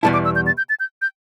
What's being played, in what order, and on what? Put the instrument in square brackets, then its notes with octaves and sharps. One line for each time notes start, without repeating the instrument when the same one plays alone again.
[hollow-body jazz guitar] E2 B2 G3 E4 [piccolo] A5
[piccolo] D6
E6
G6
A6
G6
A6
G6
G6